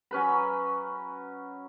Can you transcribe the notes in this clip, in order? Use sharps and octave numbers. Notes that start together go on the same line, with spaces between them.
F#3 C#4 B4 B5